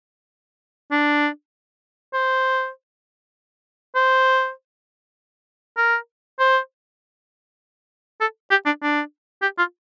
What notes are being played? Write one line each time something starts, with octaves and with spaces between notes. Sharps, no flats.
D4
C5
C5
A#4
C5
A4
G4
D4
D4
G4
F4